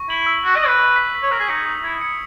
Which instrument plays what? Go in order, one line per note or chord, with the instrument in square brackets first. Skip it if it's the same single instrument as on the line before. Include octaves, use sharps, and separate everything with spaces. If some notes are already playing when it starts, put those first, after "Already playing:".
Already playing: [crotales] C#6
[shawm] E4 [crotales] F#7
[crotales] E6
[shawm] F#4 [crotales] F#7
[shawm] D#5
[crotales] F#7
[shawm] B4
[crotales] C#6
B6
B6
[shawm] C#5
[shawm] A#4 [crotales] C#6
[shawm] G#4
[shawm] D#4 [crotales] C#7
[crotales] D#6
[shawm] E4 [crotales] G#6
[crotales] C#7